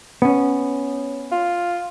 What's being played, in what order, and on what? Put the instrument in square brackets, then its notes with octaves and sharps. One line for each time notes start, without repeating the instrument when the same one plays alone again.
[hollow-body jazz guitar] B3 C#4
[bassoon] F4